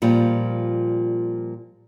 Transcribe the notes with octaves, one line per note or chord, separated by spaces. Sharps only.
A#2 F3 G3